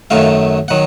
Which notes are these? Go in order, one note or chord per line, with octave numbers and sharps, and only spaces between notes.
F#2 D#3 F#3 A3 F5
D#3 F#3 F#5